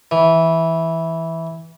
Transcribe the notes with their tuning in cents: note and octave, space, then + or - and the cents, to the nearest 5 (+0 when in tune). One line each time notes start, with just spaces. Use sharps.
E3 -10